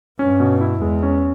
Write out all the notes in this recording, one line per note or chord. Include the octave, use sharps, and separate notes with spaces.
G2 C#4
B2
E4
E2 G#3
C#4